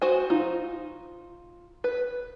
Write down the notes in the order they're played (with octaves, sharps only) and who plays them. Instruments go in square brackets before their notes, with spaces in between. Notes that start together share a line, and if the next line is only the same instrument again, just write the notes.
[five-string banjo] F#4 C5 G#5
[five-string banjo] D#4 [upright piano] F4
[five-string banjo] B4